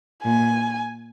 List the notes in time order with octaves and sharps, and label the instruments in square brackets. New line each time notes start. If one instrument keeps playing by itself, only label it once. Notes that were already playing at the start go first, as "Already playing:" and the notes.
[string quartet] A#2 [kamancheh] G#5